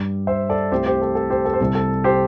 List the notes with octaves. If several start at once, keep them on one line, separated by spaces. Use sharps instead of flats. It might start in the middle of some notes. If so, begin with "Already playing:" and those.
Already playing: G2 G3
C5 E5
A4 D5
C2 C3 A3 G4 C5
G4 C5
A4
A4
G4 C5
A4
C5
C2 C3 G3 A4
A4
G4 C5